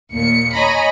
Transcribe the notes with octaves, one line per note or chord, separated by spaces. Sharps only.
D#2 A#2 C#7
C#5 D#5 G#5 A#5 B5